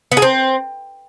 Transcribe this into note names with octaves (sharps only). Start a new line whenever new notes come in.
B3
G#4
C4